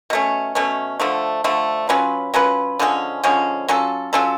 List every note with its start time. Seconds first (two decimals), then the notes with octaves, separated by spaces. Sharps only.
0.10 B2 A3 C#4
0.55 B2 A3 C#4
1.00 D3 F3 A3
1.44 D3 F3 A3
1.89 F#3 C#4 F4 B4
2.34 F#3 C#4 F4 B4
2.79 D3 F3 G#3 C#4
3.24 D3 F3 G#3 C#4
3.68 F#3 C#4 F4 A4
4.13 F#3 C#4 F4 A4